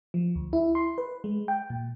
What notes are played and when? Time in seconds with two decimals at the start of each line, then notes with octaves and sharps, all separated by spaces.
0.14 F3
0.36 D2
0.53 E4
0.75 C6
0.98 B4
1.24 G#3
1.48 G5
1.70 A#2